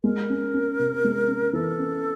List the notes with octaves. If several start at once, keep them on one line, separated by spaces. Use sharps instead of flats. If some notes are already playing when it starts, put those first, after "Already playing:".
G#3 A#4
C#4
C#4
C3
G#3
C#4
E3 A4
C#4